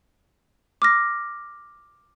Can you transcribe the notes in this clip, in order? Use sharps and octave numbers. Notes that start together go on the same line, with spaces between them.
D6 F6 A#6